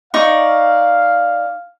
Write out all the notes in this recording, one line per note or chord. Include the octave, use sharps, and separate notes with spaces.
D#4 D5 F5 C#6